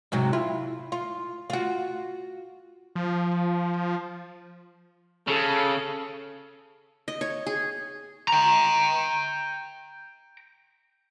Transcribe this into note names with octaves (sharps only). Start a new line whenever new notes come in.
G#2 C3 F#3
E4 F4
F4
F4 F#4
F3
C#3 A4
D#5
C#5
G#4
G5 A#5